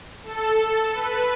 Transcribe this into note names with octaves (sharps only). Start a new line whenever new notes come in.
A4
B4